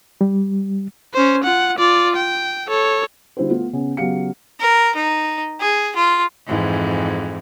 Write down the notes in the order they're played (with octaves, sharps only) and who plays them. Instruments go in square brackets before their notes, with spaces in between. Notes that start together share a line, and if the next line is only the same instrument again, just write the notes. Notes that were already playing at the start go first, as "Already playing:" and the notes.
[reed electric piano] G3
[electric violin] C#4 C5
F4 F#5
F4 D5
G5
A4 C#5
[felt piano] D3 G3 E4 F#4 C5
A3 B3 F4
C#3 B3 C#4
C#3 F#3 B3 G4 F5 C#7
[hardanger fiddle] A#4
D#4
G#4
F4
[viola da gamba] F2 G#2 E3